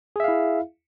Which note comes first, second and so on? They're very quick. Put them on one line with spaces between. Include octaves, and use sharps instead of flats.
G#4 E5 F5 E4